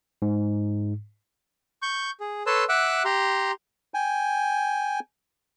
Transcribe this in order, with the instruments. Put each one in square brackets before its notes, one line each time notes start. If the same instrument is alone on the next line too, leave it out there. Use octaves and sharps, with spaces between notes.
[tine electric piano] G#2
[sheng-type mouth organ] C#6 G6
G#4
A4 B4 C#5 A5 C6 E6
E5 F#5 D6 E6 F#6
G4 A#5 C6
[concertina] G5 G#5